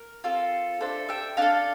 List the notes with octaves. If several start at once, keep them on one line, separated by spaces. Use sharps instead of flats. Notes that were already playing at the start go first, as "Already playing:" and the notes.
Already playing: A#4
C4 F4 A4
D4 A4 C5 E5
E5 G5
D4 A4 F5 A5